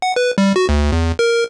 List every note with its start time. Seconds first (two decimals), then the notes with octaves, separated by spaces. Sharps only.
0.02 F#5
0.16 B4
0.38 G3
0.56 F#4
0.69 D2
0.92 E2
1.19 A#4